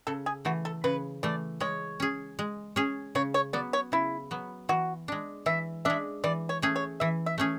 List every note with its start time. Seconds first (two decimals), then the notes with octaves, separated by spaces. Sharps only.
0.07 C#3 A4
0.26 G#4
0.45 E3 A3 F#4
0.65 A4
0.84 C#3 B4
1.23 E3 A3 D5
1.60 G#3 C#5
2.00 C#4 G#4
2.39 G#3
2.76 C#4 G#4
3.15 C#3 C#5
3.34 C#5
3.53 F#3 B3 D5
3.73 C#5
3.92 C#3 E4
4.31 F#3 B3
4.69 E3 F#4
5.08 G#3 D4
5.46 E3 E5
5.85 G#3 D4 E5
6.24 E3 D5
6.49 C#5
6.62 A3 C#4 G#4
6.76 C#5
7.00 E3 E5
7.26 E5
7.38 A3 C#4 G#4